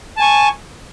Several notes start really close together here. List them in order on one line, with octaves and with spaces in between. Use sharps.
A5 G#5 C#6